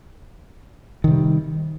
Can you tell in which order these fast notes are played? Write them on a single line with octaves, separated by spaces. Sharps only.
D#3 C3 G3